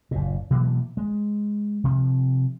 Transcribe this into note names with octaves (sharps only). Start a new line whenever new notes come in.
F#1 A#2
B2 E3 F#3 A#3
G#3
C3 F3